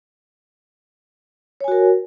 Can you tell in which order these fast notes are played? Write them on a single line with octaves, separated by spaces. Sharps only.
C#5 G#5 F#4 A#4